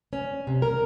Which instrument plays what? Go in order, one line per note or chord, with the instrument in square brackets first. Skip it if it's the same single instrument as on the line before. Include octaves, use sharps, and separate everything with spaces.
[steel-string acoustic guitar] C#4
C3
A#4